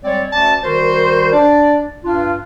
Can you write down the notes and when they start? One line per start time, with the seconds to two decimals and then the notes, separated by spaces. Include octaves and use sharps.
0.04 G3 G#3 C4 C#5 D5
0.33 D2 C#4 D5 A5
0.64 D#3 G3 F#4 A#4 C5
1.32 D4 D5
2.05 G2 D4 F4